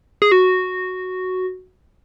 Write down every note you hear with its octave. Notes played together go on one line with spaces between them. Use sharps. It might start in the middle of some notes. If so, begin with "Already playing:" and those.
G#4
F#4